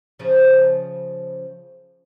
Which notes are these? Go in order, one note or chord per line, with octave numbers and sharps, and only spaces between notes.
C#3 F3